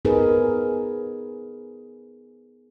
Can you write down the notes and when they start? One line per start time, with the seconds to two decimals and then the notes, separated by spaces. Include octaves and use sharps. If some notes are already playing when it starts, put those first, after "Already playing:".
0.05 B3 D#4 G#4 A#4 B4